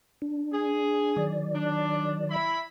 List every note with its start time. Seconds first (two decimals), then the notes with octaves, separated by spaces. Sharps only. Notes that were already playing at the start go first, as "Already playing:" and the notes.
0.22 D4
0.53 G#4
1.17 D#3 F#3 D5
1.55 D4
2.30 E4 B5